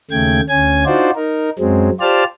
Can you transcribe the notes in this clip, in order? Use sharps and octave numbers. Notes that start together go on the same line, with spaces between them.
D#2 C#3 A3 G5 G#6
D2 C#4 G#5 G#6
D4 D#4 F4 F#4 C5 D5
D#4 A#4
F#2 F#3 G#3 C4
F4 G4 C5 D5 A5 F6